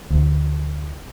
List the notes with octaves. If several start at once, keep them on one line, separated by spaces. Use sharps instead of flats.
D2